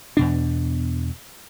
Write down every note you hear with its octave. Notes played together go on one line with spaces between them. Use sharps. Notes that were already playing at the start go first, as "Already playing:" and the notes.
E2 B2 D4